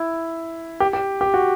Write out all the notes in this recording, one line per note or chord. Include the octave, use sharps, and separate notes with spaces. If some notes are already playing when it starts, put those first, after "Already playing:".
Already playing: E4
G4
G4
G4
F#4